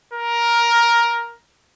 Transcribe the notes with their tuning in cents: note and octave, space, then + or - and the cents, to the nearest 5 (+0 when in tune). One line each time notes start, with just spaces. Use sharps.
A#4 +10